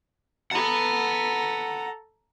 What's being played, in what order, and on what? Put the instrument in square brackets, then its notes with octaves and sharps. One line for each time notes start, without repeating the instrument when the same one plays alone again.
[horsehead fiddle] A4 A#5 [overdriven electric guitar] F#5 B5